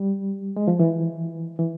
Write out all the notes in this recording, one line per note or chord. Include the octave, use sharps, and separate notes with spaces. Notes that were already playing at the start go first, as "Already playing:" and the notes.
Already playing: G3
G#3
F3
E3
E3